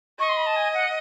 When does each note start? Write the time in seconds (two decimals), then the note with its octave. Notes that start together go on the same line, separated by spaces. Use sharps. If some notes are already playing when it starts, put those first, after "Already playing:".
0.19 D#5 C#6
0.29 C6
0.37 B5
0.46 A5
0.56 G#5
0.74 F#5